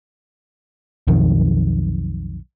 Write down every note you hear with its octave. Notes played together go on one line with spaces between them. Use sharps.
B1 F2 D#3